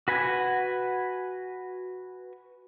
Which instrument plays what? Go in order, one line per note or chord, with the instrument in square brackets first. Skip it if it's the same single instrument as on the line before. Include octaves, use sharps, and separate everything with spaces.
[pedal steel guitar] F#4 B4 F#5 G#5